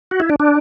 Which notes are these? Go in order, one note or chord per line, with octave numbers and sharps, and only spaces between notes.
F#4
E4
D4
D4